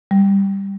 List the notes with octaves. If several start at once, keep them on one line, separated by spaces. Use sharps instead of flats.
G3